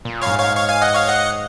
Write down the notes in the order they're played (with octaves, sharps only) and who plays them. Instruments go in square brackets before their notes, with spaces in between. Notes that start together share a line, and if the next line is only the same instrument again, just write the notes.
[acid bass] A#2
[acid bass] F#2 [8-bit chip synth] C#5 F5
[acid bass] G#2
[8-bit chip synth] C#5 F5
C#5 F5
F5 G#5
D#5 F#5
C#5 F5
D#5 F#5